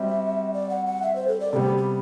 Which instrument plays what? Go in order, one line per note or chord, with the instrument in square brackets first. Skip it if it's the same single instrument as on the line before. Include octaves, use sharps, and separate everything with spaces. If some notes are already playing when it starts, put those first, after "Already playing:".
Already playing: [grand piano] G3 C4 F#4 [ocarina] E5
[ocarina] D5
F#5
F#5
E5
C5
A4
D5
[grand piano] C3 G3 B3 [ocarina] G4 A4
[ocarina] G4